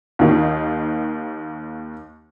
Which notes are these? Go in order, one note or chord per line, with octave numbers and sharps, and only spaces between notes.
D#2 D#3